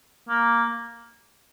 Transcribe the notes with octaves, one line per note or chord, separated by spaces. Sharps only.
A#3